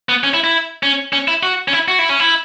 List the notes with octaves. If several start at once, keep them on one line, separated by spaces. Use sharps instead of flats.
B3
C#4
E4
E4
C#4
C#4
E4
F#4
C#4
E4
F#4
E4
C#4
E4